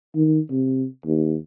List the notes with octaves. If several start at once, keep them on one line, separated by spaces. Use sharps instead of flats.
D#3
C3
D#2